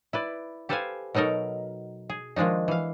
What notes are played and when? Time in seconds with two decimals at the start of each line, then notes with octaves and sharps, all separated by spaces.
0.13 E4 B4 D5
0.69 G4 A4 B4 C5 F5 G#5
1.15 B2 F#3 D#4 A4 A#4
2.10 G#4
2.36 D#3 F3 G#3 D4 D#4
2.68 E3 F5